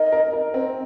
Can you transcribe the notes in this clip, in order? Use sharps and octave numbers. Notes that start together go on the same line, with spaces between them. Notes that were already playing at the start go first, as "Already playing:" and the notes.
Already playing: D#4 A#4 D#5
A#4
A#4
C4